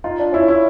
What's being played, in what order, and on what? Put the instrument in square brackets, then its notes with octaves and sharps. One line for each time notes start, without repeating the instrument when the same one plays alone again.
[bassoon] D#4 [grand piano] F4
[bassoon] D4
[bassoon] C#4 [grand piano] E4
[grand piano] E4